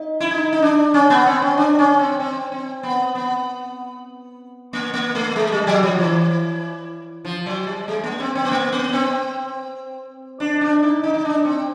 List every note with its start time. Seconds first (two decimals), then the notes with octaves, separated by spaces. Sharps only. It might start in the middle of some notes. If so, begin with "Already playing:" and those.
Already playing: D#4
0.20 E4
0.31 D#4
0.53 D#4
0.62 D4
0.94 C#4
1.10 B3
1.26 C4
1.42 C#4
1.57 D4
1.79 C#4
1.99 C4
2.20 C4
2.52 C4
2.83 B3
3.15 B3
4.73 A#3
4.94 A#3
5.15 A3
5.36 G#3
5.52 G3
5.67 F#3
5.83 F3
5.99 E3
7.25 F3
7.46 F#3
7.67 G3
7.88 G#3
8.03 A#3
8.20 C4
8.35 C4
8.45 B3
8.51 A#3
8.72 B3
8.93 C4
10.40 D4
10.61 D4
10.83 D#4
11.03 D#4
11.14 D#4
11.25 D4
11.45 C4